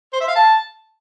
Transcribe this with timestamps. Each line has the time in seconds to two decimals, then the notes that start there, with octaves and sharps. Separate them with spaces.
0.13 C5
0.21 E5
0.28 F5
0.36 A5